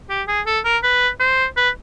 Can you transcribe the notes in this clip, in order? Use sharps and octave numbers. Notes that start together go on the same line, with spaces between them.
G4
G#4
A4
A#4
B4
C5
B4